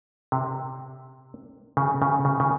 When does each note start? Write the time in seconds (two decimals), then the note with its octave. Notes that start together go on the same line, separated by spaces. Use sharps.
0.32 C3
1.77 C#3
2.02 C#3
2.25 C#3
2.40 C#3